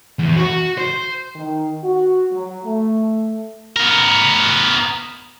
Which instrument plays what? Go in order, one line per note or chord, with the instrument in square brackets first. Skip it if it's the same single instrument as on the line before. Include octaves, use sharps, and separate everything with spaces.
[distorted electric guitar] E2
F#4
C5
[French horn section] D#3
F#4
F#3
A3
[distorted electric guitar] B3 A#4